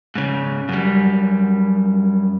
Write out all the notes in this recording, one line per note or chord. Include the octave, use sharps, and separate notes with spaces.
G#2 C#3
F#2 G3